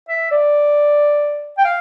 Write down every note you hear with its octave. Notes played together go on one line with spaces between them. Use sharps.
E5
D5
G5
F5